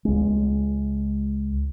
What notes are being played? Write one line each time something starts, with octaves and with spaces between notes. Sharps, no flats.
C#2 G#3